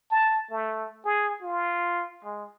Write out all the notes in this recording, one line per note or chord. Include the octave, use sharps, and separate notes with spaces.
A5
A3
G#4
F4
G#3